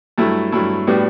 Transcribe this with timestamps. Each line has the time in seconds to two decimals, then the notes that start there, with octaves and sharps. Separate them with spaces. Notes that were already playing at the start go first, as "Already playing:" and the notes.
0.18 G2 F#3 A3 E4
0.52 G2 F#3 A3 E4
0.87 A2 G3 B3 D4 F#4